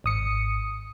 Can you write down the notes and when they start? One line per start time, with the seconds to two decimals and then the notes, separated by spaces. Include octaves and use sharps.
0.04 G#1 D#6 C#7